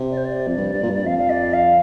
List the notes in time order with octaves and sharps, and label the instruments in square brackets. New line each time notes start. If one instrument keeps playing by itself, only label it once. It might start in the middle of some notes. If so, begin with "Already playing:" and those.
Already playing: [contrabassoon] C3
[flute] D5
C5
D5
[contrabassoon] F2
G2
G2
A#2
G2
[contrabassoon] F2 [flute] F5
[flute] F5
D5
F5